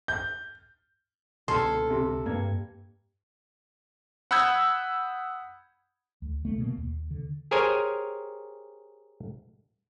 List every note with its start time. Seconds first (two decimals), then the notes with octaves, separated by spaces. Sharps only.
0.08 G6
1.48 C#2 B2 D3 A4 C6 F6 G#6 C7
1.90 C3
2.26 G2 A#3 G#6 C#7
4.31 F#5 B5 D#6 E6 G6 G#6
6.22 D2
6.45 D2 A3 A#3
6.58 B2 G#3 A#3
6.78 D#2
7.11 D3
7.51 G4 G#4 A#4 C5 C#5 G#5